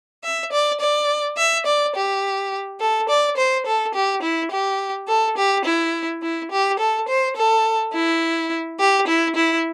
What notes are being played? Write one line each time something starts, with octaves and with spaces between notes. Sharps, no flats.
E5
D5
D5
E5
D5
G4
A4
D5
C5
A4
G4
E4
G4
A4
G4
E4
E4
G4
A4
C5
A4
E4
G4
E4
E4